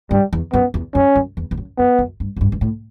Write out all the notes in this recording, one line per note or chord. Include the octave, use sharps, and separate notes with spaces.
G2 G3
E2
F#2 B3
E2
F#2 C#4
F#2
E2
E2
F#2
F#2 B3
F#2
G2
F#2
G2
G2
A2